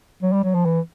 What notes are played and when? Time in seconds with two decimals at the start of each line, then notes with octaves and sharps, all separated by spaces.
0.23 F#3
0.33 G3
0.44 F#3
0.54 F3
0.65 E3